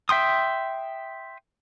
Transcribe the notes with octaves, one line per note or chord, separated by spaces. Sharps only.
E5 G5 C6 D#6